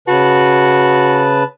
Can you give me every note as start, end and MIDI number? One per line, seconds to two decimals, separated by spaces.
0.08 1.44 49
0.08 1.36 66
0.08 1.44 71
0.08 1.44 81